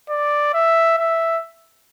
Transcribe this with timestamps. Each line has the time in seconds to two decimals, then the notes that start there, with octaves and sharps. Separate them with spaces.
0.09 D5
0.54 E5
0.98 E5